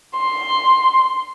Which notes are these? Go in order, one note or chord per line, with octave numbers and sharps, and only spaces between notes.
C6